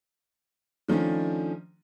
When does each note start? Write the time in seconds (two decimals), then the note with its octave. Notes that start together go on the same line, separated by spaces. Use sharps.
0.88 D#3 F3 A3 C#4 D4